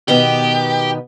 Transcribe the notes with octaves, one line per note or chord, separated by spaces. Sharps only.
B2 D#3 B3 G4